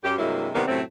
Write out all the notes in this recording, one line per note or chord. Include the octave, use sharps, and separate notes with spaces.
F#2 G4
G2 C3 F#3 G#3 A#3 E4
C3 D#3 E3 G3 A#3 B3
F#2 A2 C3 F#3 A3 C4